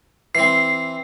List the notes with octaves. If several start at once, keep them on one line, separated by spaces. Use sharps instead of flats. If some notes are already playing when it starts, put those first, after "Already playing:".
E3 C4 C7